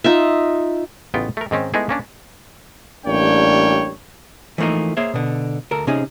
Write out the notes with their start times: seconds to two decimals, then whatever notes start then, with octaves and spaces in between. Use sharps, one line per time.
0.04 D#4 F4 E5
1.14 A1 C#3 B3 F4 G5
1.37 A3 A#4
1.51 G#2 D#3 C4 C#4
1.74 G#3 A3 B3 D#4 E4 G#4
1.89 A#3 C#4 D4
3.06 A1 G3 A#3 D4 C#5 G5
4.58 E3 F3 A3 A#3 D#4
4.97 A#3 G#4 C5 C#5 E5
5.14 B2 D3
5.71 D2 A4 A#4
5.87 C3 C#4 D#4 G#4